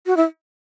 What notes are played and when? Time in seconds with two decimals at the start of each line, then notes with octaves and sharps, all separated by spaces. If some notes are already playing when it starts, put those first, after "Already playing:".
0.06 F#4
0.17 E4